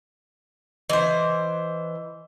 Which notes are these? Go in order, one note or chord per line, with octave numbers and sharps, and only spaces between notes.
E3 C5 D#5